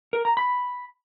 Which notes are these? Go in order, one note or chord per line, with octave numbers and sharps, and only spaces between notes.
A#4
A#5
B5